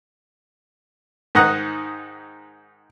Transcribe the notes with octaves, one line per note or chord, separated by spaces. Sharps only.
G#2 D#3 D#4 F#5 A#5 D#6